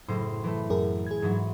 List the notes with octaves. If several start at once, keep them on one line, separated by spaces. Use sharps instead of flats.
F#1 A2 C5
E3 A3
F#2 G#4 A#4
G#4 G#6
G#2 E3 F#3